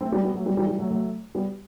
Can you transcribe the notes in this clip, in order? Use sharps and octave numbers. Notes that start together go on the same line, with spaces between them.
A3 C4
G3 B3
G3 B3
F#3 A3
G3 B3
E3 G3
E3 G3
F#3 A3
F#3 A3
G3 B3